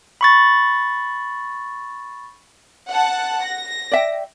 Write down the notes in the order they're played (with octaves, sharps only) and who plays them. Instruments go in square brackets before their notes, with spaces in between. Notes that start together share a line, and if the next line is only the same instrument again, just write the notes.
[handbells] B5 C#6 A6
[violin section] F#5 A5
A#6
[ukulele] D5 E5 G5